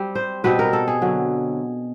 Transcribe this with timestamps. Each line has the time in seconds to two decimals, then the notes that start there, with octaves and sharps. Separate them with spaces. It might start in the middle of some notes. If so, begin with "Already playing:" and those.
Already playing: G3 C4
0.15 C5
0.44 B2 G3 C4 B4
0.59 A#4
0.73 A4
0.88 G#4
1.02 D3 F#3